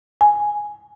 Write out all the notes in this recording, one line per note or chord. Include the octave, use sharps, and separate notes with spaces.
G#5